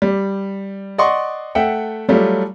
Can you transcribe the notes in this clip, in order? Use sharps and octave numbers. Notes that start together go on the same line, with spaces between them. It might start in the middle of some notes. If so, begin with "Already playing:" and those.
G3
D5 D#5 F#5 C6 C#6
A3 E5 F#5 G5
F#3 G3 A3 F4